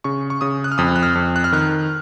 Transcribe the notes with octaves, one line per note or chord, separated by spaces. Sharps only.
C#3 C#6
C#6
C#3 D#6
F#6
F6
F2 D#6
F#6
F6
F2
F#6
F6
D#3 F#6